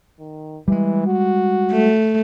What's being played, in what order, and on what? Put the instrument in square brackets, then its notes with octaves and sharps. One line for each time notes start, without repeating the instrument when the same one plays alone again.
[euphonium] D#3
[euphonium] E3 [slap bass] G3 G#3
[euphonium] F#4
[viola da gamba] A3